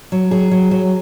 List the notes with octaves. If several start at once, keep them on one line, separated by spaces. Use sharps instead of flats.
F#3
F#3 G#4
F#3
F#3